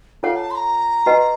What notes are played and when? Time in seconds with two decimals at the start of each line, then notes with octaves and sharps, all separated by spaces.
0.23 F4 A4 C#5 F5 F#5
0.36 A5
0.51 C6
0.55 A#5
1.06 F#4 B4 D#5 F#5 A5